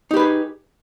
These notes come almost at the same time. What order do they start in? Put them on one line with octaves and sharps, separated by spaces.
D#4 G4 B4 G#4